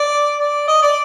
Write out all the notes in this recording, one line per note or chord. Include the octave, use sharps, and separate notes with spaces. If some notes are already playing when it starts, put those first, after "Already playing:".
Already playing: D5
D5
D#5
D5